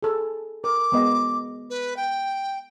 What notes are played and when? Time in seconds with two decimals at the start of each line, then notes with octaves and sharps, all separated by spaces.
0.03 G#4 A4
0.64 A#4 D6
0.92 G#3 B3 D#5
1.70 B4
1.96 G5